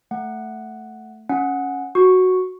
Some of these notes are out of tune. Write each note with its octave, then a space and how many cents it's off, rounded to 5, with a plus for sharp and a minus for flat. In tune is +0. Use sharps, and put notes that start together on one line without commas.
A3 +0 F#5 +0
C#4 +0 F#5 -10
F#4 +0 C#6 +0